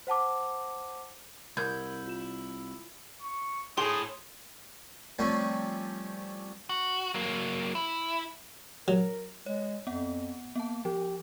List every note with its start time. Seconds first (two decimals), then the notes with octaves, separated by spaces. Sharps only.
0.07 C5 F#5 A5 D6
1.57 C2 E4 A#4 F6 G6 G#6
2.07 F4 E7
3.22 C#6
3.78 A2 G4 G#4 C6 D#6
5.19 C3 F3 G3 A3 C#4
6.69 F#4
7.14 F#3 A#3
7.75 E4
8.88 F#3 A#4
9.46 G#3 C#5
9.87 F2 B3 F#5
10.55 A#3 B3 A5
10.85 F3 G4